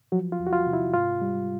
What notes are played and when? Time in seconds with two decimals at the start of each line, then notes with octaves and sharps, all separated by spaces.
0.12 F3 F#3 F#4
0.32 F4
0.39 E2
0.47 F#4
0.53 F4
0.66 C3
0.73 E4
0.93 G#2 F4
1.22 G3